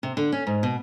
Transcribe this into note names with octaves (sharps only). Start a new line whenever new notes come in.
C3
D3
C#4
G#2
B2